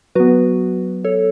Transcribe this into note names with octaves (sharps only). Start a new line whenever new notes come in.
F#3 B3 F#4 B4
A4 C#5